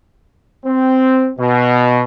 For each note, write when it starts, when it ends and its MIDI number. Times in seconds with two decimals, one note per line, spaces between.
0.65 1.30 60
1.39 2.03 47